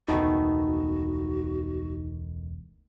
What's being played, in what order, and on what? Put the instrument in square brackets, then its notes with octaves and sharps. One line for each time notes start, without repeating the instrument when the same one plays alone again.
[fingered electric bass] E1 C#2 [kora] D#3 A3 B3 [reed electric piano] D#4 [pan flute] F#4